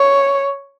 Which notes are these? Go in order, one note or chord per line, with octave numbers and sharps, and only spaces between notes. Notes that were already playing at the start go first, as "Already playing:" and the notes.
Already playing: C#5